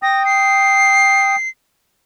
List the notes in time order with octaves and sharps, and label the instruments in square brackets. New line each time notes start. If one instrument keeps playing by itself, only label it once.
[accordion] G5 D#6 [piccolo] A#6
[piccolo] C7